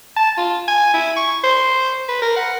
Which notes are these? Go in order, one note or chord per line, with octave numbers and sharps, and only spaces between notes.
A5
F4
G#5
E4
C#6
C5
B4
A#4
F#5